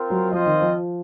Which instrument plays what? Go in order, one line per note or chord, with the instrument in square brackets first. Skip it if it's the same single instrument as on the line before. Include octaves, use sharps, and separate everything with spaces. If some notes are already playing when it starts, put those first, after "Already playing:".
Already playing: [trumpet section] C4 F4 A#4
[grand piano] F#3
[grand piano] F3 [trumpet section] C4 F4 C5 D#5
[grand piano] D#3
F3